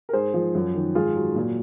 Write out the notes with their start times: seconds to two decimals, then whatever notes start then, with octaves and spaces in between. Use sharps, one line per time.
0.09 A#4
0.13 G#2 G#4 C5
0.34 F3
0.55 F#2
0.75 D#3
0.95 G#2 F4 G#4
1.16 F#3
1.36 A#2